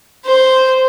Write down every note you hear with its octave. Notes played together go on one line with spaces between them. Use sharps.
C5